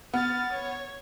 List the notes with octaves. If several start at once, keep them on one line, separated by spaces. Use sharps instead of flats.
B3 F6 A6
C#5